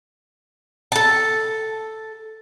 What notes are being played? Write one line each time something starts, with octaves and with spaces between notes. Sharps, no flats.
A4 A5